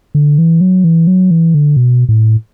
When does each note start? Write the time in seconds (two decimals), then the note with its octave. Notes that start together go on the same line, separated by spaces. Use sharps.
0.15 D3
0.38 E3
0.61 F#3
0.84 E3
1.07 F#3
1.31 E3
1.54 D3
1.77 B2
2.09 A2